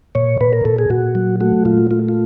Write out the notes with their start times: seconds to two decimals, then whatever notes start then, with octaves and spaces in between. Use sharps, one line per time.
0.15 A#2 C#5
0.41 A#2 B4
0.53 A#4
0.65 A#2 A4
0.79 G#4
0.90 A#2 F#4
1.15 F#3
1.41 A3 F#4
1.65 A#2 F4
1.91 A3 F4
2.09 F4